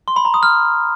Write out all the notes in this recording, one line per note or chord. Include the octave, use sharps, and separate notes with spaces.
C6
B5
A#5
D#6
F6